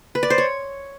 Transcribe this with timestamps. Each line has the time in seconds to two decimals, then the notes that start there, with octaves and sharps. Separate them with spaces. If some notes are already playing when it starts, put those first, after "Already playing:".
0.15 B4
0.23 D5
0.30 C5
0.38 C#5